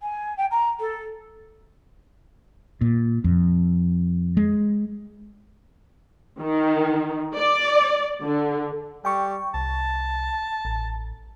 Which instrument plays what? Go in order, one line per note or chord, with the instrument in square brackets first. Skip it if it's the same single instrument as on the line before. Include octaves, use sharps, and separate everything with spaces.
[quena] G#5
G5
A#5
A4
[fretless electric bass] A#2
F2
G#3
[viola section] D#3
D5
D3
[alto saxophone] G3 [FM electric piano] G5 C#6
[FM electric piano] C2 [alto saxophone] A5
[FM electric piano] A1